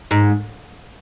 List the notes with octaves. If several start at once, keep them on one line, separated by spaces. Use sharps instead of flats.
G#2